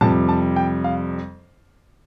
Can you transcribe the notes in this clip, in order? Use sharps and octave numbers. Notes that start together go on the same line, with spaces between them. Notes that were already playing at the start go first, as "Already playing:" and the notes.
F2 C3 G3 A5
A5
G5
F5